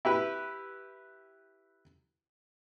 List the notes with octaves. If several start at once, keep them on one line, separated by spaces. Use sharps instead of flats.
E4 G4 B4